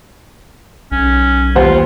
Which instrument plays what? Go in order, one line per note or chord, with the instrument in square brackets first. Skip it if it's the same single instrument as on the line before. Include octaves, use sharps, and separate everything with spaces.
[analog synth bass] B1 [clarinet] C#4
[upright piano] D#2 C5 F#5 [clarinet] F4